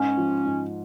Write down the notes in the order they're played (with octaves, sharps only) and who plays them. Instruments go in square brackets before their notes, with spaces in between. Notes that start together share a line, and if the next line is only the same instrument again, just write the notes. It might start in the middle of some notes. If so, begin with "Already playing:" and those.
Already playing: [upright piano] G#2 [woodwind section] C#4
[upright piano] F3
G#2